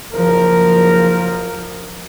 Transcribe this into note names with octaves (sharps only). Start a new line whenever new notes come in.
F#1 F3 A#4